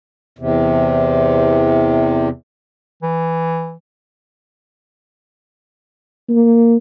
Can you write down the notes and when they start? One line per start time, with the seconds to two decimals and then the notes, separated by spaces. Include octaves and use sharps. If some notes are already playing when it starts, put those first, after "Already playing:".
0.38 E2 C3
3.02 E3
6.29 A#3